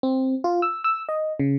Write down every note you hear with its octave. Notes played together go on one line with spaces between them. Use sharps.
C4
F4
E6
E6
D#5
C#3